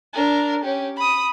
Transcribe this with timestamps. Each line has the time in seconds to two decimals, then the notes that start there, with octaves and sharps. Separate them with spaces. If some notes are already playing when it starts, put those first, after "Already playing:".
0.14 D4 A#4
0.64 C#4 G4
0.97 B5 D#6